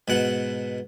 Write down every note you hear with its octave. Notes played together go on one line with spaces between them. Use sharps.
G#2 B2 F#5